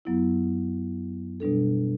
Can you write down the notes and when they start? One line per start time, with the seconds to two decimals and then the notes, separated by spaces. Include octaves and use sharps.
0.05 F#2 F#3 B3 E4
1.40 B2 G3 D4 A4